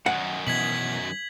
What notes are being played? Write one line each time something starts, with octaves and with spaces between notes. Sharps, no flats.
F#2 D#3 F#5
B2 E3 G#6 B6 F#7